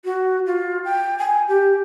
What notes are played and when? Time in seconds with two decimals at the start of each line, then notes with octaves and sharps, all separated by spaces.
0.05 F#4
0.46 F4
0.84 G5
1.18 G#5
1.48 G4